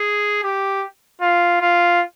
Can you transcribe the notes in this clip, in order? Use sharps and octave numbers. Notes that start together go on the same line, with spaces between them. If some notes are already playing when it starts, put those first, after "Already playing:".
Already playing: G#4
G4
F4
F4